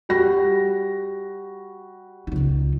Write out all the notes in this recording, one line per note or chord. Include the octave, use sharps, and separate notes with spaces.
G3 F#4 A#6
C#2 D#4